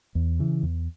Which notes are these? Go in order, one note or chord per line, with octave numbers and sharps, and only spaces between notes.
E2
C#3 E3
E2